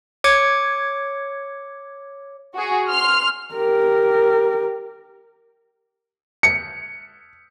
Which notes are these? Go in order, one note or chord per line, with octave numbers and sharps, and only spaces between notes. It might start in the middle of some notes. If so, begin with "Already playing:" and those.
C#5 D6 G#6 C#7
F#4 G#4
C6 F6
G4 A#4
C#7